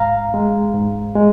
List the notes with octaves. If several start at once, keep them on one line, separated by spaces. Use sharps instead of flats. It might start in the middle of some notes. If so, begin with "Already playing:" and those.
Already playing: G#2 F5 A#5
G#3
G#2
G#3